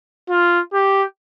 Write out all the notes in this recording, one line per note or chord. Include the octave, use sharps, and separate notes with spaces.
F4
G4